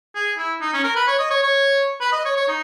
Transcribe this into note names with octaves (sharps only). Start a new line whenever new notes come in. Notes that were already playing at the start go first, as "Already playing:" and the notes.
G#4
E4
D#4
C#4
A#4
B4
C#5
D#5
C#5
C#5
B4
D#5
C#5
C#5
D#4